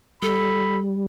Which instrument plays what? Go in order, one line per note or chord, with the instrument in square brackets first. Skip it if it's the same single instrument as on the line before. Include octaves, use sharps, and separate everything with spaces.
[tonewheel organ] G3 [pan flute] A4 [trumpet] B5